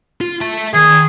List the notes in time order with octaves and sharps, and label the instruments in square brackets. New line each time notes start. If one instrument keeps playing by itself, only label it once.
[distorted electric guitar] F4
E5 A5
[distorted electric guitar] D2 D#3 [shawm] G#4